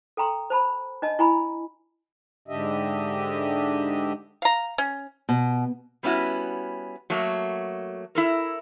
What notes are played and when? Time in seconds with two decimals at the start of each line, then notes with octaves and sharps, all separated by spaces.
0.17 A4 G5 A#5 C6
0.50 C5 A5 B5
1.02 D4 D#5 A5
1.19 E4 G#5 A#5 B5
2.48 G#2 D3 D4 G4 D#5 E5
4.42 F5 A#5
4.78 C#4
5.29 B2
6.03 G3 B3 C#4 E4 F#4
7.10 F#3 A3 A#3 A4
8.15 E4 A4 A#4